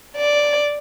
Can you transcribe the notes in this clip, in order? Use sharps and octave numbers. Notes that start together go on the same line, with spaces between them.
D5